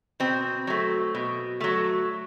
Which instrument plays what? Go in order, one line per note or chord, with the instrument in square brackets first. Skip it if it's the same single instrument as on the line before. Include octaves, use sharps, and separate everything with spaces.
[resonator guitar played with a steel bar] B2 C4
F#3 A3
B2
F#3 A3